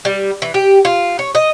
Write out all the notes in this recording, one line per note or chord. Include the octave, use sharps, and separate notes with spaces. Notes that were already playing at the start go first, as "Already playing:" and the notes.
G3
E3
G4
F4
C#5
D#5